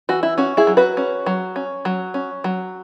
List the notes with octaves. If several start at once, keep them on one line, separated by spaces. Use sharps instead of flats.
E3 F#4
E4
C#4 F#4
E4 G#4
F#3
F#4 B4
C#4
F#3
C#4
F#3
C#4
F#3